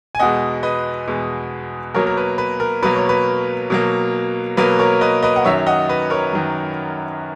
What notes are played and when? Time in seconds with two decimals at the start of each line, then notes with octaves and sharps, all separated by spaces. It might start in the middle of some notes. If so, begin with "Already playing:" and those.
0.15 G#5
0.19 E2 B2 G#3 D#5 F#5
0.63 B4 D#5
1.07 E2 B2 G#3
1.94 B2 F#3 A#3 A#4 C#5
2.07 A#4
2.17 B4
2.38 B4
2.60 A#4
2.83 B2 F#3 A#3 B4
2.96 C#5
3.09 B4
3.70 B2 F#3 A#3
4.57 B2 F#3 A#3 B4
4.79 A#4 C#5
5.01 B4 D#5
5.23 B4 D#5
5.36 F#5
5.45 F#2 D#3 F#3 C#5 E5
5.67 D#5 F#5
5.89 B4
6.10 A#4 C#5
6.33 F#2 D#3 F#3